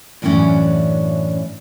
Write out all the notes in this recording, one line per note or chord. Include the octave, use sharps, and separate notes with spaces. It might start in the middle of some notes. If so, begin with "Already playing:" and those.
F#2 A2 E3 G3 C#4 D4